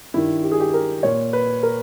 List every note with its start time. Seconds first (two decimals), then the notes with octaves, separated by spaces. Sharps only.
0.14 G2 D#3 E4
0.43 G4
0.52 G#4
0.60 G4
0.74 A#4
1.03 A#2 C#5
1.33 B4
1.63 A#4